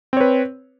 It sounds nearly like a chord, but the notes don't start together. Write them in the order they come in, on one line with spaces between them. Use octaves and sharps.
C4 C#5 B4